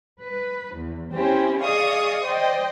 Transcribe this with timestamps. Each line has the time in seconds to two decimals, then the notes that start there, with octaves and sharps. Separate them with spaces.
0.22 B4
0.76 E2
1.15 C4 C#4 E4 G4 C5
1.62 G#4 D5 D#5 F5 C#6 D#6
2.25 C5 D5 D#5 G5